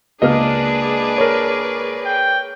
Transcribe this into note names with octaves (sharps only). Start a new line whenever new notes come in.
C#2 A#3 D4 G#4 B4 D5 D#5 F6
A#4 C#5
G5